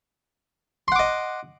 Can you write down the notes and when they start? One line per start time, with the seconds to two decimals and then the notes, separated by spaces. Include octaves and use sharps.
0.88 C6
0.92 F#5
0.96 D6
0.99 D#5